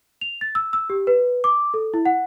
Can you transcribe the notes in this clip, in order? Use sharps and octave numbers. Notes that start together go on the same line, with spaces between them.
F7
A6
E6
E6
G4
B4
D6
A4
E4
F#5